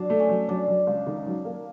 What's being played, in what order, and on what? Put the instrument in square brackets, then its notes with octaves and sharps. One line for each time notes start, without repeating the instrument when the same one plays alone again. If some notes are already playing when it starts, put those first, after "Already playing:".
Already playing: [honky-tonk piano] F#3 [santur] D4
[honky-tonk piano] A3
[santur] C#4
[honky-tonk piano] F#3
[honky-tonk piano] F#3 [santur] D4
[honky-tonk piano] F#3
C#2
D#3
F#3
A#3